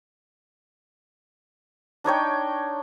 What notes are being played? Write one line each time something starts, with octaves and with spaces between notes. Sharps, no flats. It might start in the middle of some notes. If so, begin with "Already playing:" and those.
D4 D#4 C#5 G5